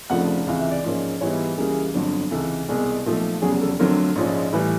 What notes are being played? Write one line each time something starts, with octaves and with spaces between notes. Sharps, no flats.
F1 F2 C#3 F3 A3 F#5
C#2 C3 E3 F5
E5
D5
G#2 F3 A#3 C#4
G#2 E3 G3 B3 E4 C#5
C#2 C#3 E3 G3 A#3 G#4
G1 F2 D3 F#3
C#2 C3 E3 A4
C2 B2 G#3 G#4
B1 A#2 F3 A3
F1 E2 C#3 F#3 G#4
A4
F2 D3 F#3 A3 C4 A#4
A#1 G#2 F3 G#3 C#4
A2 E3 G3 B4